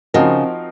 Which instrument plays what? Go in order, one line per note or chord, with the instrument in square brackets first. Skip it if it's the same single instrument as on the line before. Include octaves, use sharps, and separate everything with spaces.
[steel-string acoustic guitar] C#3 [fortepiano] F3 C4 D#4 F#4 A#4